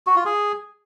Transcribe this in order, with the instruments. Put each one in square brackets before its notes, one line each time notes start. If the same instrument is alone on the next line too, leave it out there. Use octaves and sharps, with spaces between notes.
[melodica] F#4
F4
G#4